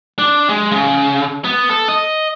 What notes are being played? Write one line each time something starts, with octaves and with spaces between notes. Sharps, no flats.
D4
G#3
C#3
B3
A4
D#5